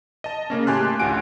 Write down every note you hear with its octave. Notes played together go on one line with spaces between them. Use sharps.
D#5 A5
C#3 A#3 C#4
A2 G4 G#5 A5 C6 F#6
A1 D2 F4 F#5 G#5 D7